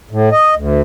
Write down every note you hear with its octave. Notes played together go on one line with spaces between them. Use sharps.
A2
D#5
D2